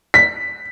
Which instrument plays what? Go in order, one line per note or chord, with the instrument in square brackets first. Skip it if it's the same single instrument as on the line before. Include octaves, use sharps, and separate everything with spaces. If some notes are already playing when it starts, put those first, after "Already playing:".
[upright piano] B6